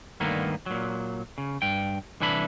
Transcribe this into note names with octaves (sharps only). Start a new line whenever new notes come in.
D2 G2 D3 D#3 A#3 B3
A#2 F#3
C#3
G2 G5
C2 E3 D4 E4 A4 B5